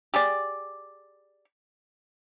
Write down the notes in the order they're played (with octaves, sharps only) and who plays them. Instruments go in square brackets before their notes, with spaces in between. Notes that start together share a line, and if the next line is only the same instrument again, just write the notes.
[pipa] G4 G#4 D5